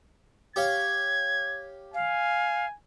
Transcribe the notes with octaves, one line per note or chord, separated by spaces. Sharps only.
G4 C#5 F5 G#6
F5 G#5